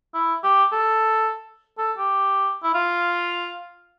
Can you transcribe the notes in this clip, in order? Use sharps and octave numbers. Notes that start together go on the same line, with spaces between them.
E4
G4
A4
A4
G4
E4
F4